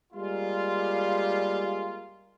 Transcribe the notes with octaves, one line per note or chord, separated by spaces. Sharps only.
G3 G#3 A#3 F4